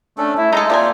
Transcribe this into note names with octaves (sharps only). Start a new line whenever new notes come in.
A3 C#4 D4 A4
A3 E4
G#3 D#4 F4 A4 D#5
C3 A#3 F4 G4 D5 E5 G#5